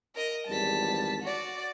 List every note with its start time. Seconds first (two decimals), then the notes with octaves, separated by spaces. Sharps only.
0.15 A#4 D#5
0.47 G#1 E2 G3 A5 B6
1.23 F#4 D5